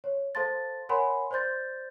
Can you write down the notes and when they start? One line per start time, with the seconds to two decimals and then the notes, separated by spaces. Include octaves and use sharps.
0.04 C#5
0.35 A4 C5 F5 A5 C6 A6
0.89 A#4 C#5 F#5 G#5 B5 C6
1.31 C5 D5 C6 G6 A6